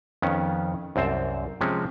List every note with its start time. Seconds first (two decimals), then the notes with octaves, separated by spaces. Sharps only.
0.22 F2 D#3 B3 C#4
0.96 C2 F#2 C4 C5 A5
1.61 C3 F3 G#3 C4 C#4